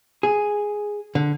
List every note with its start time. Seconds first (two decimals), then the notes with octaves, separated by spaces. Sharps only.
0.23 G#4
1.15 D3